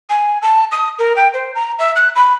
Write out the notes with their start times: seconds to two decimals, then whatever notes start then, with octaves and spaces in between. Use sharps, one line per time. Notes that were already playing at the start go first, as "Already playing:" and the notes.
0.10 G#5
0.42 A5
0.71 D#6
0.99 A#4
1.16 G5
1.34 C5
1.55 A#5
1.79 E5
1.96 F#6
2.15 B5